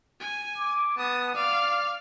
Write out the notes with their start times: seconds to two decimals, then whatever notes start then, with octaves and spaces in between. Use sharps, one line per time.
0.20 G#5
0.57 D6
0.97 B3 A5 D#6
1.35 D5 F5